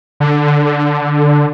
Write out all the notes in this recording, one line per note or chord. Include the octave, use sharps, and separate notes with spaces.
D3